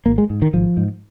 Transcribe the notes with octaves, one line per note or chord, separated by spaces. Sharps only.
G#1 A#3
G#3
G#2
D#3
G#1 F3
G#2